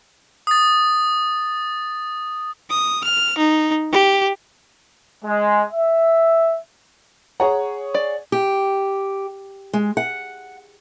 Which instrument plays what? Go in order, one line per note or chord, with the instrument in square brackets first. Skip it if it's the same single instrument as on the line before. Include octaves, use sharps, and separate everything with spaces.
[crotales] D#6 A6
[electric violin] D#6
F6
D#4
G4
[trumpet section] G#3
E5
[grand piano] G#4 C#5 F#5 [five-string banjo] A#5
[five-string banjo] D5
[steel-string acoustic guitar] G4
G#3
F#5